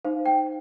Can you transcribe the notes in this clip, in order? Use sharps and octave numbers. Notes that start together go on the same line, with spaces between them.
D#4 C5 F5
G5